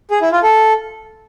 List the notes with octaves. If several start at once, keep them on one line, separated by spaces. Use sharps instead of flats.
G#4
E4
F4
A4